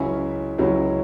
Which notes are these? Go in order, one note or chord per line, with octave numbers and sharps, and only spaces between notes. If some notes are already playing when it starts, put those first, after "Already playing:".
Already playing: C#2 C#3 F#3 C#4 E4 E5 G#5
C#2 C#3 F#3 C#4 E4